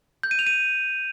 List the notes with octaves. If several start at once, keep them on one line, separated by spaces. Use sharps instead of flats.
G6
D#7
F7
D#7